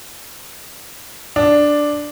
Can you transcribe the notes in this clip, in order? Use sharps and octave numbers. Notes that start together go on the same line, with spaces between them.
D4